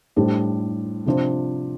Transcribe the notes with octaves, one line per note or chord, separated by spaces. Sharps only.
A2 G3 D4 G4 C5
C3 F3 D4 F4 C5